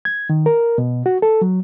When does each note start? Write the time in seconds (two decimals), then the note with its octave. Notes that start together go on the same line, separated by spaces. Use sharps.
0.05 G#6
0.30 D#3
0.46 A#4
0.78 B2
1.06 F#4
1.22 A4
1.42 F#3